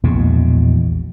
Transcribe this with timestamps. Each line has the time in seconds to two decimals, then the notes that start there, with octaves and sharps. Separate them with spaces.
0.03 A#1 E2 G#2 B2